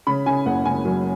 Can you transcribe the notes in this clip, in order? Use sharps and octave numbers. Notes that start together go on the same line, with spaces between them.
C#3 B5
C#3 G#5
F#1 F#5
C#3 G#5
F#2